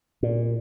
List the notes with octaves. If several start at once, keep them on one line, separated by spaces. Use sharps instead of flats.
A#2